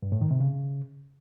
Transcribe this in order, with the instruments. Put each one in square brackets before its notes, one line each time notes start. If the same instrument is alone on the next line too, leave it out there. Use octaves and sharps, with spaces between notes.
[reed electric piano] G2
A2
D#3
C3
C#3